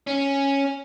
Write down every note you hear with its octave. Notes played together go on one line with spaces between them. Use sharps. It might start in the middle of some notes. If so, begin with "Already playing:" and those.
C#4